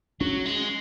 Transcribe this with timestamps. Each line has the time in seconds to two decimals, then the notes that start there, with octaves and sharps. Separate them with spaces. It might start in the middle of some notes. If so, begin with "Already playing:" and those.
0.21 F#3 C#4
0.46 G#3